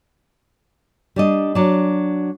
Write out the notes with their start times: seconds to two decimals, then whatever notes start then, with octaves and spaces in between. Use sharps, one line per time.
1.16 G3 D4 D#5
1.55 F#3 D4